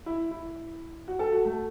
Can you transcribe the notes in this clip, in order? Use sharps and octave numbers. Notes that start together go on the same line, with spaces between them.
E4
E4
F#4
A4
F#4
A3